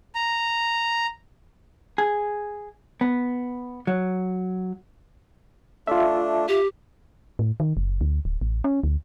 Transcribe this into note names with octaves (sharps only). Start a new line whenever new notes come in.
A#5
G#4
B3
F#3
A3 D4 F4 E5
G4
A2
D#3
F#1
D2
D1
A1
C#4
D2